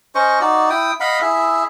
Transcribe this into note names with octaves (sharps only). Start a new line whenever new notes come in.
C#4 C5 D#5 C#6
D#4 F#4 D5
E4 G5 D#6
D#5 F5 F#5 B5
E4 G#4 E5